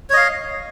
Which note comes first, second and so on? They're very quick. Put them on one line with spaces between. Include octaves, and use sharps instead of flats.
C#5 D#5 F5